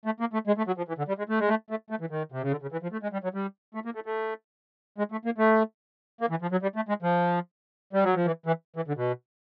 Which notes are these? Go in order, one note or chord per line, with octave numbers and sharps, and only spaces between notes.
A3
A#3
A3
G#3
A3
F#3
F3
E3
D3
G3
G#3
A3
G#3
A3
A3
A3
E3
D#3
C3
C#3
D3
C#3
E3
F3
A3
G#3
G3
F#3
G3
A3
A#3
A3
A3
G#3
A3
A#3
A3
A#3
E3
F3
F#3
G3
A3
G#3
F3
G3
F#3
F3
E3
E3
E3
D3
B2